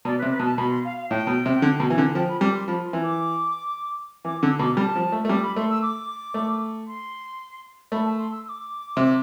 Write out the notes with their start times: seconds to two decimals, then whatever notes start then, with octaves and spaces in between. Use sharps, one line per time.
0.05 B2 D5
0.18 B4
0.22 C3
0.31 B4
0.39 B2
0.45 A5
0.58 B2 B5
0.70 C6
0.84 F5
0.97 F5
1.10 A2 G5
1.27 B2
1.46 C3
1.62 D3
1.80 B2
1.90 E3
1.98 D3
2.15 F3 G5
2.28 B5
2.41 G3 D6
2.54 C6
2.67 F3 B5
2.85 C6
2.93 E3
3.02 D6
4.25 E3 D6
4.43 D3 E6
4.59 B2 D6
4.77 G3 B5
4.82 A5
4.96 F3
5.12 A3
5.25 A3
5.29 G3 D6
5.42 B5
5.56 A3 C6
5.69 E6
5.82 D6
6.34 A3
6.87 C6
7.92 A3 B5
8.05 A5
8.18 C6
8.32 E6
8.45 E6
8.49 D6
8.97 C3